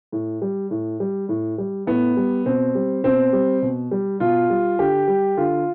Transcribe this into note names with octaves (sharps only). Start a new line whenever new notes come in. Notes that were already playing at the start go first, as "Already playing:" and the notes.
A2
G3
A2
G3
A2
G3
A2 B3
G3
B2 C4
G3
B2 C4
G3
B2
G3
B2 F4
G3
D3 G4
G3
D3 F4